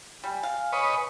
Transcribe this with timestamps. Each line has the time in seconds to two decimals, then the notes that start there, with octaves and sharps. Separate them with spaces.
0.24 G3 G#5
0.43 F5
0.73 B4 C#5 D#5